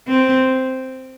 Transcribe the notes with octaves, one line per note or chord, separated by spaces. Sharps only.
C4